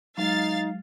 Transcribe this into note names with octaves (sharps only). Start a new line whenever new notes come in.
F#3 G#3 D#4 F5 A6